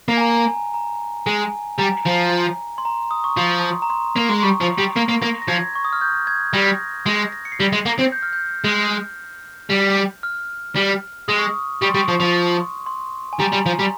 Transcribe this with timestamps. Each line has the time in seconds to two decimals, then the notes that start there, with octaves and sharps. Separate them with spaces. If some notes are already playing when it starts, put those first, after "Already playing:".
0.08 A#3
0.17 G#5
0.21 A#5
0.48 G#5
0.74 A#5
1.27 G#3 G#5
1.79 G3 A#5
2.06 F3
2.78 C6
2.85 A#5
3.11 D#6
3.24 C#6
3.37 F3 C6
3.82 A#5
3.90 C6
4.16 A#3
4.29 G#3
4.42 G3 C#6
4.61 F3
4.78 G3
4.96 A#3
5.08 A#3
5.22 A#3 A#6
5.42 A#6
5.48 F3 G#6
5.75 C#6
5.85 D#6
5.93 F6
6.01 G6
6.27 G#6
6.53 G3 A#6
7.06 G#3 A#6
7.32 A#6
7.45 C#7
7.52 C7
7.60 G3 A#6
7.72 G#3
7.86 A#3
7.99 C4
8.12 G6
8.23 F6
8.33 G6
8.64 G#3
9.70 G3
10.23 F6
10.76 G3
11.28 G#3 D#6
11.39 C#6
11.48 D#6
11.82 G3 C#6
11.89 C6
11.95 G3 C#6
12.08 F3
12.20 F3
12.86 C6
13.33 G#5
13.40 G3 A#5
13.53 G3
13.66 F3
13.79 G3